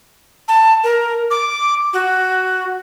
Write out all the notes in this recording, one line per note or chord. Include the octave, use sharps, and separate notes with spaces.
A5
A#4
D6
F#4